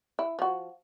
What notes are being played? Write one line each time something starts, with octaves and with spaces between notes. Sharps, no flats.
E4
F3 F#4